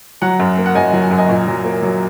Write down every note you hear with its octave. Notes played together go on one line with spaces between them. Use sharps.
F#3 F#5 A#5
F#2
A#3
F#5
F#2 D#5 G#5
F#3
G#5
F#2 F#5
D#5 G#5
A#2
F#3
A#3
F#3